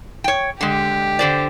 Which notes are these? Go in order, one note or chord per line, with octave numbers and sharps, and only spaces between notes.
C#5 G5
D3 G#3 G4
D3 C5 D5